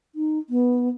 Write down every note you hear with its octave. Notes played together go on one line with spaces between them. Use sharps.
D#4
B3